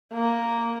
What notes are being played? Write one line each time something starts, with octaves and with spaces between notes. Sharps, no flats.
A#3